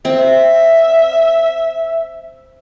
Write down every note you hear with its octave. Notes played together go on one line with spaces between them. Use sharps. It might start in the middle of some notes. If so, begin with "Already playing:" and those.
C4 E5